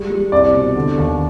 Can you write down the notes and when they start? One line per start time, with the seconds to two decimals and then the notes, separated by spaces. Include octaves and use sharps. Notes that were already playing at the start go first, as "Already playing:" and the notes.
Already playing: G3 G#3
0.10 G3
0.32 C2 D5
0.53 B2
0.76 D3
0.97 D#2